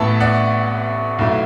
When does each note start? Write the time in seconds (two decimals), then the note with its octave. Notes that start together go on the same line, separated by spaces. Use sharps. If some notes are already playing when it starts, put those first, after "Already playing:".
Already playing: A1 A2 E3 B3 E4 E5 A5
0.20 D5 F#5
1.19 B1 B2 A3 E4